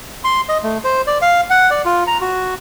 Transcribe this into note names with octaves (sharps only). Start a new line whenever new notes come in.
C6
D#5
A3
C5
D5
F5
F#5
D5
F4
A#5
F#4